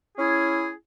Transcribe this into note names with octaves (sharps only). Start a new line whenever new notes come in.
C#4 E4 G#4